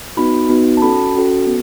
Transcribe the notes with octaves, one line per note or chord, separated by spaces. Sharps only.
B3 D#4 F#4 B5
B3 D#4 F#4
A5
C#4 F#4 A4 B5
C#4 F#4 A4
B3